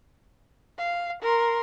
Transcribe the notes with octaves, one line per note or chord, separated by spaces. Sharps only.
F5
A#4 C6